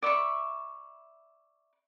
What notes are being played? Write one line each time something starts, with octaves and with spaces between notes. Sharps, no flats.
D5 E5 B5 C#6